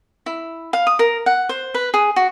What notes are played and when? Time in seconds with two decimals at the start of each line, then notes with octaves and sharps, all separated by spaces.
0.26 E4
0.73 F5
0.87 D#6
0.99 A#4
1.26 F#5
1.49 C5
1.74 B4
1.94 G#4
2.16 F#4